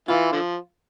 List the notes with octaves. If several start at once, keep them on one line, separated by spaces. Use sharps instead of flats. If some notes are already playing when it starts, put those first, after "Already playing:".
E3 F4
D3 F3